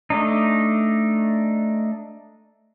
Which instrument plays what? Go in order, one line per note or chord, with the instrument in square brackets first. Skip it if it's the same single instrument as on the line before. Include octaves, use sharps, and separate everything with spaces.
[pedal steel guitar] A3 D4 D#4